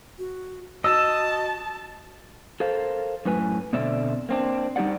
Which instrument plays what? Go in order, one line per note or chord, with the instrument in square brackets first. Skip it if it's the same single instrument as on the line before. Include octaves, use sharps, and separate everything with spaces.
[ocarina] F#4
[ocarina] F#4 [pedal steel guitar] D#5 [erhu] A5 [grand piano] E6
[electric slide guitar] A4 A#4 C5 F5
F#2 A2 B4 G#5
B2 D3 C4 D5 E5
A#3 C4 D4
G3 D#4 G4 D5 F#5